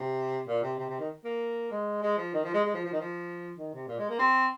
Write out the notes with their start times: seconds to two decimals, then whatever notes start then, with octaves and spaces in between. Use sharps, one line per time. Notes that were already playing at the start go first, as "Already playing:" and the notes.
Already playing: C3
0.48 A#2
0.63 C3
0.78 C3
0.89 C3
0.99 D#3
1.25 A#3
1.71 G#3
2.02 G#3
2.17 F3
2.33 D#3
2.44 F3
2.54 G#3
2.64 G#3
2.74 F3
2.85 F3
2.92 D#3
3.00 F3
3.57 D#3
3.73 C3
3.88 A#2
3.98 G#3
4.09 A#3
4.19 C4